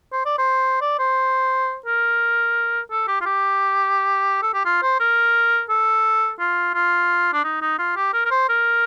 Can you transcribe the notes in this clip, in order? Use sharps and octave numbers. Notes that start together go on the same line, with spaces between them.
C5
D5
C5
D5
C5
A#4
A4
G4
F4
G4
A4
G4
F4
C5
A#4
A4
F4
F4
D4
D#4
D#4
F4
G4
A#4
A#4
C5
A#4